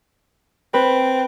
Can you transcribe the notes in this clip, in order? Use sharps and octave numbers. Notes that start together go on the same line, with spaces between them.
C4 B4